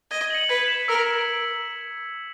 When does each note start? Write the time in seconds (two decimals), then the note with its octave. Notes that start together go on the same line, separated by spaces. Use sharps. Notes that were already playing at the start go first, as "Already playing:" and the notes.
0.11 D#5 G#6
0.30 C#7 F#7
0.49 B4 G#6
0.68 B6 E7
0.88 A#4 E6